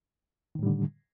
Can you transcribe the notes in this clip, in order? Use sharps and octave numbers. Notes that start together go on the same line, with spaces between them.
A2 D3 D#3 G3